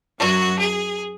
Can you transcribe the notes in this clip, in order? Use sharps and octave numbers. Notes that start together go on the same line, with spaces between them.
F#2 F#3 F#4
G#4